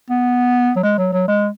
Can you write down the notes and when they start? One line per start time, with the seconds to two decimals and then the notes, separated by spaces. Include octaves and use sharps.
0.10 B3
0.76 F#3
0.83 G#3
0.98 F#3
1.13 F#3
1.28 G#3